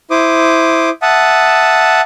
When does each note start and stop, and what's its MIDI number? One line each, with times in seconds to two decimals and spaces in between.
0.11 0.90 64
0.11 0.90 72
0.11 0.90 86
0.11 0.90 87
1.02 2.01 76
1.02 2.01 78
1.02 2.01 81
1.02 2.01 87